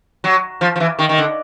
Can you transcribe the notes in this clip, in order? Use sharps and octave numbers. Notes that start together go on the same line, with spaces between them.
F#3
F3
F3
E3
D#3
D#3
D3